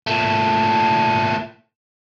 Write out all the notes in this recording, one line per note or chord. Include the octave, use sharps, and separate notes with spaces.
A#2 A3